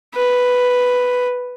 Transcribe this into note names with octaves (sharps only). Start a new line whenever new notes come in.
B4